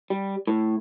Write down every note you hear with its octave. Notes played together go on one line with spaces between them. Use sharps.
G3
A2